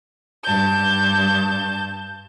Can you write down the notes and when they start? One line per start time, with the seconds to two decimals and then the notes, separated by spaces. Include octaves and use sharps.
0.44 G2 A5 G6